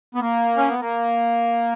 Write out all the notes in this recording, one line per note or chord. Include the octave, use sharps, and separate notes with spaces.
B3
A#3
C#4
B3
A#3